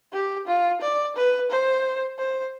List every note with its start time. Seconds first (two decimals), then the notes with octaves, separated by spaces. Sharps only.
0.13 G4
0.47 F4
0.81 D5
1.16 B4
1.50 C5
2.19 C5